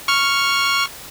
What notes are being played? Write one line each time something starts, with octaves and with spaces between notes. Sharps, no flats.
C#6 F6